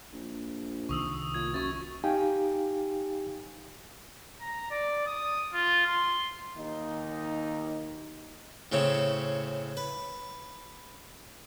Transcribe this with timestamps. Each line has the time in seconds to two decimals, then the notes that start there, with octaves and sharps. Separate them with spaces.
0.13 A#1
0.89 C2 D#3 C#6 D#6 E6
1.34 A#2 G#6
1.54 F#2 C#6 A6
2.04 D#4 G4 F5 G5 G#5
4.41 A#5
4.70 D5
5.07 D#6
5.53 F4
5.86 C6
6.57 D#2 D#4
8.72 A2 C#3 C4 C#4
9.77 B4